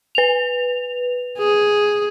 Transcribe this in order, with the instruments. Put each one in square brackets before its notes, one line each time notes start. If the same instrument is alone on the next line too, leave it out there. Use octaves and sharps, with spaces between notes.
[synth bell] B4 F7
[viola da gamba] G#4